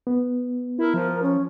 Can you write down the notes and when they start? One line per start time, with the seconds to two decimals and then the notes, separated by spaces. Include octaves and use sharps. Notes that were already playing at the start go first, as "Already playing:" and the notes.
0.07 B3
0.79 E4 A#4
0.94 F3
1.22 C#4